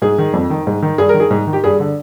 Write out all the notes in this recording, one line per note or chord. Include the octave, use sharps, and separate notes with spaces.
G#2 G#4
D#3
F2
D#3
G#2
D#3
G2 G#4
D#3 A#4
G#4
G#2
D#3
G4
G2 G#4
D3